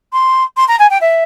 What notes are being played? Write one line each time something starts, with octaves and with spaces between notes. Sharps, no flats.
C6
C6
A#5
G#5
G5
E5